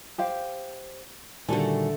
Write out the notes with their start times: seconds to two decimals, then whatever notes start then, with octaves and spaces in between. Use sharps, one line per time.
0.18 G4 C5 F5
1.49 A#2 D3 D#3 G3 A3 F#4 A4 G#5